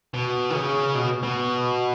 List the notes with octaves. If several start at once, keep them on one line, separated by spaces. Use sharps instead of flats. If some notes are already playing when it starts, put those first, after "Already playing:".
B2
D#3
C#3
B2
B2